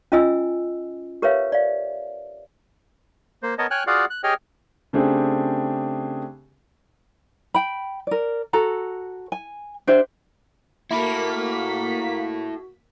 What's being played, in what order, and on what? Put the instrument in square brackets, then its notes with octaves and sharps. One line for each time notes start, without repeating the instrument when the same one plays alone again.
[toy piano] C#4 F4 D#5 G#5 E6
G4 A#4 B4 C#5 E5 F5
D5 F5
[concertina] A#3 C5
B3 A#4 C#5 D#5 A5
C#5 G5 G#5 F6 F#6
F4 F#4 G#4 D5 F5 F#5
F#6
G4 G#4 C#5 D#5 G5 F6
[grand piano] C#3 A3 C4 D4 G4 G#4
[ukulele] G5 B5
A#4 D5
F#4 A4 A#5
G#5
D4 G4 C5 E5
[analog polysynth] A#3 B6 [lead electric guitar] E4 A4 [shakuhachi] F#4 [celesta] E5 B5